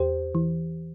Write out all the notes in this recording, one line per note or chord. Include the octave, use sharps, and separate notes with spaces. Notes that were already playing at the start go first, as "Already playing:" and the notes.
Already playing: E2 G4 C5
E3